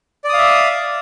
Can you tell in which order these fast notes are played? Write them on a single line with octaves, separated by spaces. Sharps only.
D5 D#6 F5 E5